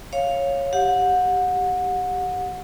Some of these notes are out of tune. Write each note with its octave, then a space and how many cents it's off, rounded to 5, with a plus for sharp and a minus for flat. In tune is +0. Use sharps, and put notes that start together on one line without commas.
C#5 -10 F5 +0
G4 +0 F#5 -30